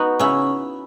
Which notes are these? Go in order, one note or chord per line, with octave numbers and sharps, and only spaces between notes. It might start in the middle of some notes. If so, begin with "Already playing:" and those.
Already playing: B3 D#4 F#4
C#3 C#4 E4